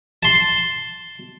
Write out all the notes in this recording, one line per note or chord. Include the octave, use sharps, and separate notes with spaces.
A5 C6